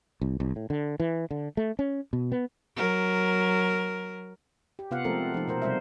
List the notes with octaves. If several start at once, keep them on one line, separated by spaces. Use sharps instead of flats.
C2
C2
A2
D3
E3
D3
A3
C#4
B2
B3
F#3 A#4
G4
C3 B3 F4 F5 F#5
F3 G#3 A3 C4 A4 A#4
F3 D#4
B2 A#4 C5
C3 G3 C5 E5